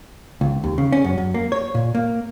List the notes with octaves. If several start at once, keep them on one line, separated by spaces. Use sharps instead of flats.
C#2
D#2
C#3
C#4
F#2
F#2
A#3
C#5
A#2
A#3